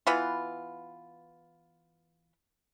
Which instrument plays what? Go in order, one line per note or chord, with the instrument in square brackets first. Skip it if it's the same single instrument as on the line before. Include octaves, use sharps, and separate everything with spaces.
[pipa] E3 B3 F4